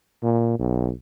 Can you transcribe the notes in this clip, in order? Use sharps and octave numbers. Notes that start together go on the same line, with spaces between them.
A#2
B1